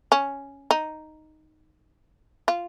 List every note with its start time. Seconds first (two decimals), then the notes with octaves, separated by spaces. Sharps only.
0.12 C#4
0.71 D#4
2.48 F4